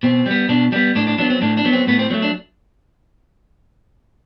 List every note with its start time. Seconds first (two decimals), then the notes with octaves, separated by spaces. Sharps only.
0.03 B2 C4
0.26 G3 B3
0.49 B2 D4
0.72 G3 D4
0.76 B3
0.95 A2 D4
1.07 D4
1.18 F#3 B3 D4
1.30 C4
1.42 A2 D4
1.57 D4
1.65 F#3 B3
1.72 C4
1.87 A2 B3
1.99 C4
2.10 F#3 C4
2.14 A3
2.22 D4